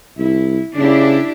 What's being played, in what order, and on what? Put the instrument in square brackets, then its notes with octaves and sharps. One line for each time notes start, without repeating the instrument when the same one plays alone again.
[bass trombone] C2 [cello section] E4
[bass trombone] C#3 [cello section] D4 E4 G4